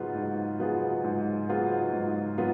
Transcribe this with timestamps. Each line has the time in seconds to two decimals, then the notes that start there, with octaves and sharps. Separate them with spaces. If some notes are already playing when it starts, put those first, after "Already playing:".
Already playing: G#2 F#3 B3 F4 G#4
0.15 G#2
0.59 F#3 B3 F4 G#4
1.04 G#2
1.49 F#3 B3 F4 G#4
1.93 G#2
2.38 F#3 B3 F4